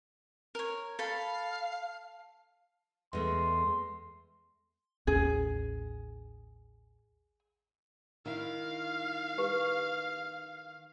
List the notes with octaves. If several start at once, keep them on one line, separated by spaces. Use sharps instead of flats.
A#4 C#5
A4 F5 B5
E2 G#3 A3 C6
A1 D#2 C#4 G#4
D#3 E4 F5
G4 B4